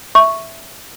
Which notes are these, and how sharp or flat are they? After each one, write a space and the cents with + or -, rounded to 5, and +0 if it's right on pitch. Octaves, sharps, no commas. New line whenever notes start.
E5 +0 C#6 +0